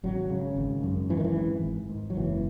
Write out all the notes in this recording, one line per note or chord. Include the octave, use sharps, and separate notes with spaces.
G#1 F#3
C#3
G#1
F#2
G#2 E3
D#3
E3
G#1
G#1
G#2
F#3
F#1 E3